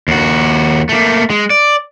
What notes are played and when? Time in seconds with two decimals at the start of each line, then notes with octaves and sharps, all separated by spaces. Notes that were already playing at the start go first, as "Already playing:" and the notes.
0.08 D#2 F#4
0.89 A3 A#3
1.30 G#3
1.50 D5